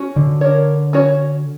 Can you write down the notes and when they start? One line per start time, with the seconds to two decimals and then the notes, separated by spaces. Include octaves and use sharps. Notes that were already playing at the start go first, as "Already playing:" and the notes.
Already playing: C#4 F#4 C#5
0.16 D3
0.41 D4 A#4 C#5
0.93 C#4 F#4 C#5